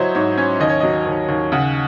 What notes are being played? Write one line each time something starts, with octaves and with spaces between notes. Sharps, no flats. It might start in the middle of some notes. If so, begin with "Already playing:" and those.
Already playing: F#3 E4 C5 C#5 D#5
G#2 C#5
C#4 C#5
D#2 D#5
C#5
F#3 D#5
D#2
D#2
C#3 F#5